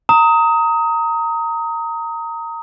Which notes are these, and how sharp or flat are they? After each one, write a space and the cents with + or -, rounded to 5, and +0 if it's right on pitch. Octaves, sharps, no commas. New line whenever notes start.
A#5 -20 D#6 +20